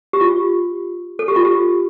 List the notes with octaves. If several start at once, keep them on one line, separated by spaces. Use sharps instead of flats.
G4
F4
A4
G4
F4
G4